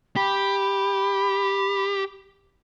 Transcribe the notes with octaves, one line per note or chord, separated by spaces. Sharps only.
G4 B5